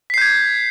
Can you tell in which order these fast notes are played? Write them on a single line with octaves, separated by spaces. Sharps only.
B6 C7 G6 G#6